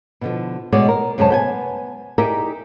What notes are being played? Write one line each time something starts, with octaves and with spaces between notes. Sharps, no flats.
B2 D3 F3
B2 G#3 B3 C#5 D5
A#4
F#2 C3 G#3 C5 C#5 A5
B3 G5 G#5
D#4 G4 G#4 A#4 D5 E5